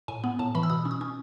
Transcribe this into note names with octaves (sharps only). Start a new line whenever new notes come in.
A2 G#5
B3
A2 A5
E3 B5
E6
B2 D#6
C#4
D#6
C#4